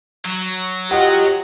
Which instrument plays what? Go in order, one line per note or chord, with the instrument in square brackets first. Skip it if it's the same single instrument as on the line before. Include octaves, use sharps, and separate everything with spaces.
[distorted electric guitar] F#3
[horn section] F4 D#5 [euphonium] G4 [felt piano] F#5